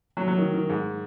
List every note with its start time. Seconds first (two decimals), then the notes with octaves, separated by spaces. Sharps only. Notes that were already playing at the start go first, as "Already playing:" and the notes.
0.17 F#3
0.28 F#3
0.38 D#3
0.54 D#3
0.69 G#2